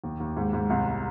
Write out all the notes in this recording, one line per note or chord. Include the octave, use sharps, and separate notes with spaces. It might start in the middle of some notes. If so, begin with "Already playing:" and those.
D#2
D#2
G#2
G#2
C2